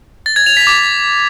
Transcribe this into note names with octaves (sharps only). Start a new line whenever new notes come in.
A6
G#6
F7
B6
D6